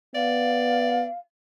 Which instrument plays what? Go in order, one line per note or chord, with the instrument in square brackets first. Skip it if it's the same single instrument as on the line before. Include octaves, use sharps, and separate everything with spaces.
[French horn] B3 [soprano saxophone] D5 [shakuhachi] F5